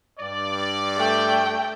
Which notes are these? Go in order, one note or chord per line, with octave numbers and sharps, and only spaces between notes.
G2 D5
A3 G5